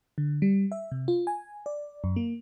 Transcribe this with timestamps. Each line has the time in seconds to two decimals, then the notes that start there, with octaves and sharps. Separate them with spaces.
0.18 D3
0.42 G3
0.72 E5
0.92 C3
1.08 F4
1.27 G#5
1.66 D5
2.04 F#2
2.16 A#3